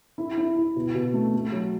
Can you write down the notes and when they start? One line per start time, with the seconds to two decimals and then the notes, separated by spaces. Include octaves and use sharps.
0.18 E4
0.38 E4
0.56 E4
0.76 B2
0.95 B2
1.14 A3
1.33 A3
1.52 F#3